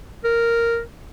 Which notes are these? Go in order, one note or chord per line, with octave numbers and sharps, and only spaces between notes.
A#4